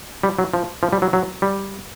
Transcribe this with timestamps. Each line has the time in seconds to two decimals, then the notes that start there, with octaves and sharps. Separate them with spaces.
0.23 G3
0.39 F#3
0.54 F3
0.83 F3
0.93 G3
1.02 F#3
1.13 F#3
1.42 G3